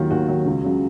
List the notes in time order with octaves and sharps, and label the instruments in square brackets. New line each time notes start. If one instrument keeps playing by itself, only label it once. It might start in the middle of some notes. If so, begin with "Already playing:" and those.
Already playing: [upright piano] D#2 D#3 F#3 F4
D#2 F#4
D#3 F#3
C#2
C#3 F#3